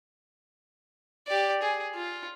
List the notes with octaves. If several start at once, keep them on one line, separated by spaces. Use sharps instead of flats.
G4 D5
G#4
F4